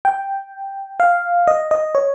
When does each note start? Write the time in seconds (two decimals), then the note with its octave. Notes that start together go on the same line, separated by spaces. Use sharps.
0.05 G5
1.00 F5
1.48 D#5
1.71 D#5
1.95 C#5